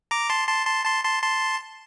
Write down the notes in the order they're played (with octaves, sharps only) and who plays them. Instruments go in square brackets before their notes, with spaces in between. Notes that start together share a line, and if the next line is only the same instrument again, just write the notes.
[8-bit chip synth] A#5 D6
A5 C6
A5 C6
A5 C6
A5 C6
A5 C6
A5 C6